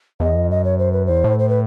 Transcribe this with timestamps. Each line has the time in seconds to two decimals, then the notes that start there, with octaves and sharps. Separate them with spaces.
0.20 E2 D#5
0.35 F2
0.50 F#2 D#5
0.64 C#5
0.78 C5
0.93 B4
1.06 E2 C5
1.24 A2
1.39 C5
1.49 B4